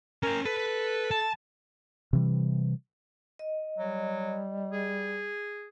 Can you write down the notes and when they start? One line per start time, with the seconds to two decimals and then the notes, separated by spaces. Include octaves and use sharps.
0.23 C#4 A#4 G5
0.45 A4 B4
1.11 A5
2.13 C3 E3 G3
3.39 D#5
3.78 F#3 G3
4.72 G#4